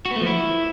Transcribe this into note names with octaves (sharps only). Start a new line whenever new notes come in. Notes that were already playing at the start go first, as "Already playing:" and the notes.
F#4
B3
A3
F3
E4